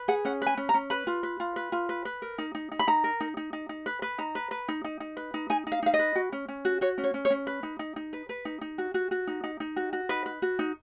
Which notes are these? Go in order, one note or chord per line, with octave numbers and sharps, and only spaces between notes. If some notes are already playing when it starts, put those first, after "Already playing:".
Already playing: B4
G#4 F#5
C#4 F#5
B4 G#5
C#4
A#5
C#4
B4 B5
F4
B4
F4
B4
F4
B4
B4
A#4
D#4
D#4
D#4
B5
D#4 A#5
A#4
D#4
D#4
D#4
D#4
B4
B4
D#4 A#5
B4
B4
D#4
D#4
D#4
B4
D#4
D#4 G#5
D#4
F5
D#4 F5
D#5
B4
F#4
C#4
C#4
F#4
F#4 C#5
C#4
C#5
C#4
C#5
C#4
B4
D#4
D#4
D#4
B4
B4
D#4
D#4
F#4
F#4
F#4
D#4
D#4
D#4
F#4
F#4
D#4 B4
B4
F#4
D#4